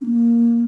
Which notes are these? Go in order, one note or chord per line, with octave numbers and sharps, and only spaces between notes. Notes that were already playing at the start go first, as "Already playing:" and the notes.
C#4
A#3